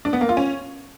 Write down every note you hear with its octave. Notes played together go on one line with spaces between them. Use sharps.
D4
B3
A#3
F4
C#4